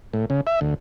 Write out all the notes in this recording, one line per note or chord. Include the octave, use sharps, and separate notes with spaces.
A2
C#3
E5
D2